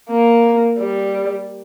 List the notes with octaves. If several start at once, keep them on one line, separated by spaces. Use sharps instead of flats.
A#3
G3